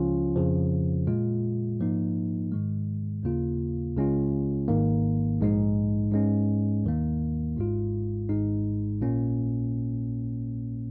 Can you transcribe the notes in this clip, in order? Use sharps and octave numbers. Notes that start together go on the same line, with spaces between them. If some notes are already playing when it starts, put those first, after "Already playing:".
Already playing: C#2 C#3 F3 C#4 F4
F2 C#3 F3
A#2 G#3 F4
G#2 F3 A#3 D#4
G#2 D#3 G#3
D#2 C#3 A#3 F4
C#2 C#3 G#3 C#4 F4
G#1 G#2 D#3 A#3
A#1 G#2 G#3 D#4
G#2 G#3 C#4
D#2 D#3 A#3
G#1 G#2 G#3 F4
G#1 G#2 G#3 D#4
A#1 A#2 A#3 C#4